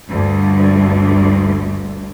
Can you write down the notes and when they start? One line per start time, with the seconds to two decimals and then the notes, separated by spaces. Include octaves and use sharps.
0.11 G1 D2 G2